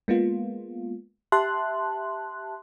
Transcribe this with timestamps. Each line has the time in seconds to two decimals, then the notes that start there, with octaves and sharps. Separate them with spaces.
0.08 G#3 A#3 B3 F4
1.32 G4 E5 A5 C6 F#6